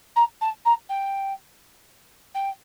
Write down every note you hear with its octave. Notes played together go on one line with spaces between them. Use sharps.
A#5
A5
A#5
G5
G5